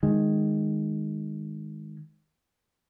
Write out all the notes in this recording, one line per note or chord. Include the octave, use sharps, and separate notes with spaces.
D#3 G#3